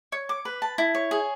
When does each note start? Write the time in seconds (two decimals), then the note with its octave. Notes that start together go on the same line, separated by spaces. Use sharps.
0.12 C#5
0.29 D6
0.45 B4
0.62 A5
0.78 E4
0.95 C#5
1.11 G#4